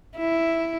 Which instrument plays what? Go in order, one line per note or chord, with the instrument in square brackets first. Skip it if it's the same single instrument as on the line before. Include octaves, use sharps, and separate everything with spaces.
[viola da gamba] E4